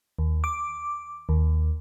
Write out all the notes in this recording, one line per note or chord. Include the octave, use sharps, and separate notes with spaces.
D#2
D6
D#2